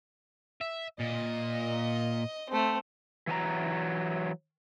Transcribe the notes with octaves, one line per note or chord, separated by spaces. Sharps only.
E5
A#2 D#5
A3 C4
E3 F#3 G#5 A#5